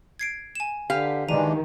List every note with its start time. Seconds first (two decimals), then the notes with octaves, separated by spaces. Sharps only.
0.19 G#6 C7 D7
0.55 G#5 E7
0.90 D3 G4 B4 F5
1.28 D#3 E3 G#3 D4 A#5 D#7